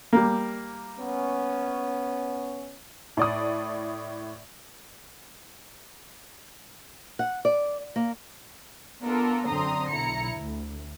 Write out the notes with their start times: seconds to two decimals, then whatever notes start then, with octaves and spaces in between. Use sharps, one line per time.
0.13 G3 A#3
1.00 B3 C#4
3.17 A2 D5 D#6
7.19 F#5
7.45 D5
7.96 A#3
9.02 B3 D4 F4 A4 A#4
9.48 F#2 D3 C4 A#5 C6 D#6
9.91 B1 E4 A#5 C#7
10.34 D2